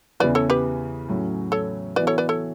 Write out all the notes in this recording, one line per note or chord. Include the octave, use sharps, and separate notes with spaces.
E2 C#3 E3 B4 D5
A4 C#5
G4 B4
A2 F#3 C#4
A4 C#5
E3 B3 F#4 B4 D5
A4 C#5
B4 D5
A4 C#5